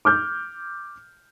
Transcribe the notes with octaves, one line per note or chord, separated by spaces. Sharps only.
D6 F6 G6